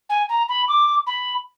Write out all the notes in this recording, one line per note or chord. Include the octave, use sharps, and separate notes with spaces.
G#5
A#5
B5
D6
B5